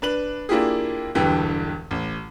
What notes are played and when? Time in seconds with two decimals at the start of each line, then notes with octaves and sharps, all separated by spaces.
0.02 D4 B4 F#7
0.49 A#3 D4 E4 F4 G4 G#4
1.15 E1 G2 D3 E3 G4 G5
1.91 A1